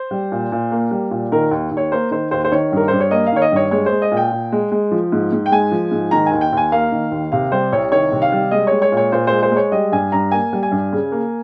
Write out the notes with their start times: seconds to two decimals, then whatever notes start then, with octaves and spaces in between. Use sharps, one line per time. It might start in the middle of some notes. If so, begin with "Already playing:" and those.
Already playing: C5
0.11 G3
0.32 A#2
0.52 A#2
0.72 A#3
0.91 G3
1.11 A#2
1.32 D#3 A#4
1.51 D#2
1.71 D#2
1.77 C#5
1.92 A#3 C5
2.11 D#3 C5
2.31 D#2 C5
2.44 C5
2.52 D#3 C#5
2.72 G2 A#4
2.88 G2 C5
3.00 C#5
3.11 A#3 D#5
3.27 F5
3.32 D#3 C#5
3.42 D#5
3.52 G2 C#5
3.71 G#3 C#5
3.86 C5
3.92 G#3
4.02 D#5
4.12 A#2
4.17 G5
4.31 A#2
4.52 G#3
4.72 G#3
4.91 F3
5.12 G#2
5.32 G#2
5.46 G5
5.51 G#3 G#5
5.71 F3
5.91 G#2
6.11 D#3 A#5
6.26 D#2 G#5
6.41 G5
6.52 D#2 G#5
6.72 A#3 F5
6.92 D#3
7.11 D#2
7.32 C3 F5
7.52 G3 C5
7.72 C2 C#5
7.92 D#3 C#5
8.12 C3
8.22 F5
8.32 G3
8.51 G#3 D#5
8.67 G#3 C#5
8.82 C#5
8.92 A#2
8.97 C#5
9.12 A#2 C5
9.27 G#3 C5
9.43 C5
9.51 G#3
9.56 C#5
9.72 G3 D#5
9.92 G2 G#5
10.12 G2 A#5
10.31 A#3 G#5
10.53 G3
10.63 G#5
10.71 G2
10.92 C#3
11.12 A#3